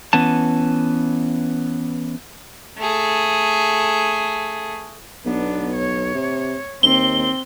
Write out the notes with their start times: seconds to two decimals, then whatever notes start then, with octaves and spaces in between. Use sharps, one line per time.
0.13 E3 B3 C#4 A5
2.78 A3 G#4
5.25 B1 B3 D4
5.74 C#5
6.15 C3
6.83 D#2 C4 G7